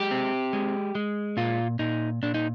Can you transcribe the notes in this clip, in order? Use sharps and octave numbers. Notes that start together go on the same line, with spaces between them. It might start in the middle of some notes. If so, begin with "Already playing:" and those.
Already playing: G#3 G4
C4
G#3
G#3
A#2 F4
A#2 D#4
A#2 D4
D#4